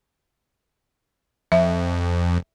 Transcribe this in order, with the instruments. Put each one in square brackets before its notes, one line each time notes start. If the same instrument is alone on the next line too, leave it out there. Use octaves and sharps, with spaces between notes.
[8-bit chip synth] F2 [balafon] E5